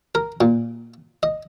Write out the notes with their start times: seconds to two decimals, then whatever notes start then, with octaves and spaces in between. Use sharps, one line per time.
0.15 A#4
0.41 A#2
1.23 D#5